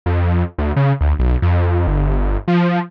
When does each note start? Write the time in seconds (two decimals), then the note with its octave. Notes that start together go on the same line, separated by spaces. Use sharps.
0.06 F2
0.58 D2
0.76 C#3
1.01 D2
1.19 B1
1.42 F2
1.87 G1
2.48 F3